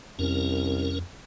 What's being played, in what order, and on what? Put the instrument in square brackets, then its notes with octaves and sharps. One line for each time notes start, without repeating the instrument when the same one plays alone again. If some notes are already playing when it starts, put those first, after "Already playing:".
[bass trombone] C2 [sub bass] F2 [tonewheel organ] C#4 A#4